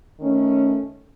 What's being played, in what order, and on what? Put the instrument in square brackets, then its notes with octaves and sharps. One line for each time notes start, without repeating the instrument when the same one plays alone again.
[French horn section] D#3 A3 C#4